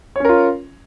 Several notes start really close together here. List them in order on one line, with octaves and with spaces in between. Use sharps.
C#5 C#4 A#4 F4